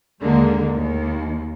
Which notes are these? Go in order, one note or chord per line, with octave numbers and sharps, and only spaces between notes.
D#2 D3 G#3 A#3
D#2